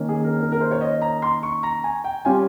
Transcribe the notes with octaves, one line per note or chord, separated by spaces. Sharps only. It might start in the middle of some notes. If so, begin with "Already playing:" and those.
Already playing: D#3 A#3 C#4
G#4
A#4
A#4
A#4
C5
C#5
D#5
A#5
C6
C#6
A#5
G#5
G5
G3 C#4 F4 G#5